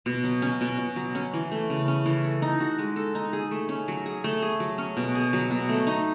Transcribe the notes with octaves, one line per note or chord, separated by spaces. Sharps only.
B2
F#3
C#4
B2
B2
F#3
C#4
E3
A3
C#3
C#4
E3
A4
D#4
F#4
G#3
A4
D#4
G#4
A3
C#4
F#3
G#4
A3
G#4
F#3
C#4
B2
G#4
F#3
B2
A3
D#4